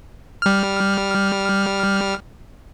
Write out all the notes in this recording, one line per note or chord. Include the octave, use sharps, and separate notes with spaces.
G3 F6